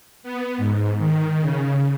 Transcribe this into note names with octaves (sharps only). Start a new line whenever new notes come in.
B3
G#2
D#3
C#3